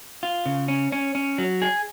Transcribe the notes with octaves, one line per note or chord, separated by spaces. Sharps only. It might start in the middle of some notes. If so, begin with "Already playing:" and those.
F4
C#3
C#4
C#4
C#4
F#3
G#4